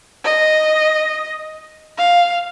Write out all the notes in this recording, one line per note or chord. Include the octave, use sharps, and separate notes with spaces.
D#5
F5